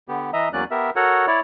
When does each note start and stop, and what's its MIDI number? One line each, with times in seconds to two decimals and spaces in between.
0.08 0.31 50
0.08 0.31 59
0.08 0.31 67
0.33 0.49 52
0.33 0.49 75
0.33 0.49 76
0.33 0.49 82
0.53 0.64 40
0.53 0.64 54
0.53 0.64 58
0.53 0.64 61
0.53 0.64 74
0.53 0.64 90
0.71 0.90 59
0.71 0.90 67
0.71 0.90 70
0.71 0.90 76
0.96 1.26 66
0.96 1.26 69
0.96 1.26 70
0.96 1.26 73
0.96 1.26 78
1.27 1.40 64
1.27 1.40 73
1.27 1.40 74